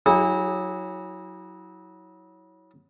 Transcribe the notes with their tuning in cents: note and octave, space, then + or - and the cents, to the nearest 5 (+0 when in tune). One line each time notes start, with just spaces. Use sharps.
F#3 +0 E4 -35 G#4 -35